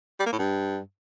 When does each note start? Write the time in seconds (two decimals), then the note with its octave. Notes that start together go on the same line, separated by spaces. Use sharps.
0.19 G3
0.26 A#3
0.32 A2
0.39 G2